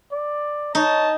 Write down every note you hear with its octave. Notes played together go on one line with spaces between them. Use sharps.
D5
D#4 C#5 A5